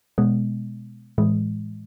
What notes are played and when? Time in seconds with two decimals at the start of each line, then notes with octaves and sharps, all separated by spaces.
0.18 B2 G#3 B3
1.18 A2 E3 G#3